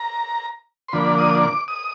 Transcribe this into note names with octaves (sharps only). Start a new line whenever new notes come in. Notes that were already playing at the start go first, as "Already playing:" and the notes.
Already playing: A#5
C6
D3 F3 A#3 D4 B5
D#6
D6
D#6